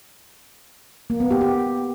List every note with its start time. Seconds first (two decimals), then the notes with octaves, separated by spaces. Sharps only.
1.10 A#3
1.20 B3
1.31 G4
1.41 G4